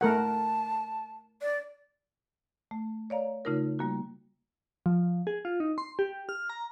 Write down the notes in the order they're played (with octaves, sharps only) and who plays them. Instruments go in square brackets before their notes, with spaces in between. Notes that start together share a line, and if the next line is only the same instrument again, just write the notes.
[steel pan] A3 A#4 F#5 [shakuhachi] A5
[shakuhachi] D5
[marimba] A3
C#5 D5 F5 A#5
C#3 A3 D#4 F4 A#4
G3 A#3 F#4
[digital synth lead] F3
G#4
F4
D#4
C6
G4
F6
A#5